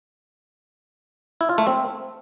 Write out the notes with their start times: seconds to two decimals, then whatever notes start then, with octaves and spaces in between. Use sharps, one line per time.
1.41 E4
1.49 F4
1.58 A3
1.67 C4